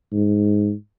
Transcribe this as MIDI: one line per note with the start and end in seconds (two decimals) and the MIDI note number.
0.12 0.73 44